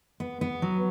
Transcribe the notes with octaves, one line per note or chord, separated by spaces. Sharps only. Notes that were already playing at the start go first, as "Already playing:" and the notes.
B3
B3
F#3